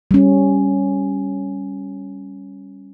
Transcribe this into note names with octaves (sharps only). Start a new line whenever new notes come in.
G3 C#4